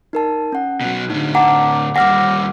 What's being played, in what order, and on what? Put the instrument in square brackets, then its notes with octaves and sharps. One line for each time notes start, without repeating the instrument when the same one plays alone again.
[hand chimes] D#4 A#4 A5
C#4 F#5
[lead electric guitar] B2 F#3
[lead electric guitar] A2 D3 [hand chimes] D#4
[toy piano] F#5 [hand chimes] A5 A#5 D6
[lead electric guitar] D#2 G3 [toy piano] F#5 [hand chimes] D6 F6 A#6